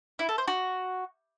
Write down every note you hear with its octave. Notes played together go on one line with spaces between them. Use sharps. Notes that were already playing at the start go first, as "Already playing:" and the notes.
E4
A4
C5
F#4